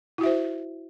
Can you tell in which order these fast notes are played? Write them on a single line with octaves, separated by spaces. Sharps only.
E4 F#4 E5 C5